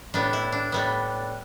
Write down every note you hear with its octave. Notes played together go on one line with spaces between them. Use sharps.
A2 G3 B3 D4
E4
D4
A2 G3 B3